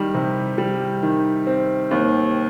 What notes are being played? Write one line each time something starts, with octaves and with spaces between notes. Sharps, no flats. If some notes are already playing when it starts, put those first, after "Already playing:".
Already playing: D#3 G3
C3
G3
D#3
C4
D#2